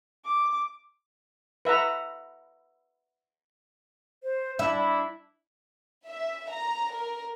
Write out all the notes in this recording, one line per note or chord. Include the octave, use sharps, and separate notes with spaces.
D6
B4 E5 F#5 A#5
C5
D4 E4 E5 B5
E5
A#5
A#4